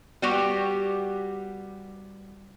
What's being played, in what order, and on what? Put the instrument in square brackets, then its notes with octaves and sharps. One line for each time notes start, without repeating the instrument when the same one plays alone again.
[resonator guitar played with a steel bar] G3 B3 F#4 G4